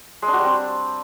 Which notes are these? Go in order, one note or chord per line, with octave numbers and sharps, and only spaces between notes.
G#3
D4
F#4
G3
C4